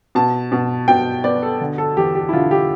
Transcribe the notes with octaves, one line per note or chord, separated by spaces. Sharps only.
B2 A5
B2
B2 G5
B3 D5
A4
D3
A4
E2 G4
G4
E4
D3 F4
G4